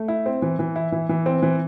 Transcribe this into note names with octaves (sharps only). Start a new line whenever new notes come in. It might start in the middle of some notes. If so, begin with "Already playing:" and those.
Already playing: A3
E4
C4
E3
E3
E4
E3
E3
C4
E3